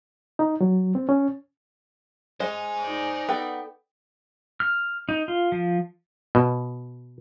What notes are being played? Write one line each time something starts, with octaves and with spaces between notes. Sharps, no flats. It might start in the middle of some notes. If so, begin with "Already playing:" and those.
D#4
F#3
C4
C#4
G#3 C5 G#5
D#4 D5
B3 A4 G5
F6
D#4
F4
F3
B2